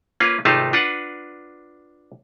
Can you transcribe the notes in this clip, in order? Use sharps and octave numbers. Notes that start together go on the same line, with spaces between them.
A#3 C#4 F4 B4
G#1 C3 A3 D#4 F4 A5
D4 F4 B4 F#5